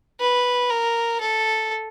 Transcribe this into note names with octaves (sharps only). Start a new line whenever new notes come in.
B4
A#4
A4